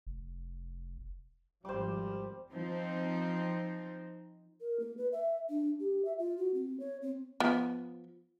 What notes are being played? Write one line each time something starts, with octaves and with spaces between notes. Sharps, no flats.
F1
G#1 F3 G3 C5 D6
F3 C4 D#4
A#4
A#3
B4
E5
D4
G4
E5
F4
F#4
C4
C#5
C4
F3 B3